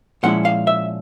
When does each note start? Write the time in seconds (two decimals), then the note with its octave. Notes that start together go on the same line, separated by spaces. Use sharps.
0.23 A#2 F3 G#3 C#4 E4 F#5
0.45 F5
0.67 E5